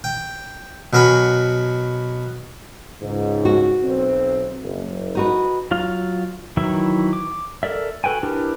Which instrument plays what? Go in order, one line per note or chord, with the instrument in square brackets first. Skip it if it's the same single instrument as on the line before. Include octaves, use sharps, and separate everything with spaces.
[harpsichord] G5
B2 F#3 A#4 G#5 B5
[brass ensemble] C#2 G#2
[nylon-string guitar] F#4
[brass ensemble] B1 C4
F#1
[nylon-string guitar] D#4 F#4 B4
[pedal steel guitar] F#3 F4 F5
D#3 E3 F#3 E4 E5
D6
A4 A#4 D5 E5
F#4 A4 B4 G5 G#5
D4 E4 G4 A#4 B4